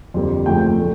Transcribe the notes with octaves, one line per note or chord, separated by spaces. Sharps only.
F2 D3 G3 A#3
F2 C#3 F3 A3 G5
A#2 A3